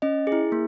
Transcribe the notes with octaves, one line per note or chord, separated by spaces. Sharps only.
C#4 D#5
G#4
E4
A#3